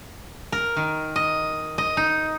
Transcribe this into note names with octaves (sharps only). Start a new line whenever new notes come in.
A#4
D#3
D#5
D#5
D#4